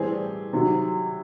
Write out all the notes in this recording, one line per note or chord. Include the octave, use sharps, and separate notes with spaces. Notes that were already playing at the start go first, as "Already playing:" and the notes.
Already playing: A2 E3 G3 C4 G4 G#4
C3 D#3 F#3